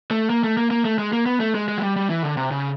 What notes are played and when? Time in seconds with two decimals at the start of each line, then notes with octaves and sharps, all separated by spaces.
0.11 A3
0.30 A#3
0.44 A3
0.57 A#3
0.71 A#3
0.85 A3
0.98 G#3
1.13 A#3
1.26 B3
1.40 A3
1.55 G#3
1.68 G#3
1.78 F#3
1.82 G3
1.96 G3
2.10 E3
2.23 D3
2.37 C3
2.51 C#3